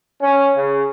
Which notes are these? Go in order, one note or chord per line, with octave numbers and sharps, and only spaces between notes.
C#4
C#3